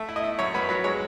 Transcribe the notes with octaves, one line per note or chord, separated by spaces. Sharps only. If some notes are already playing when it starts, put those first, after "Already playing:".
Already playing: A3 E5
E4
D#5
E4
F#2 C#5
F#2 B4
F#3 B4
G#3 C#5